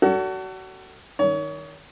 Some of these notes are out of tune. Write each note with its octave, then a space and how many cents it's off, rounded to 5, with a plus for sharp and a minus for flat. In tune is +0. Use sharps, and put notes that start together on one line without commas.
F#4 +30 A4 +30 D5 -45
D#3 +0 C#5 +30